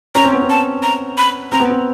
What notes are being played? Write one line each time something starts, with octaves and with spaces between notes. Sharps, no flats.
C#4 A#5
C4
B3
C4
A5
A#5
B5
C4 A#5
B3
C4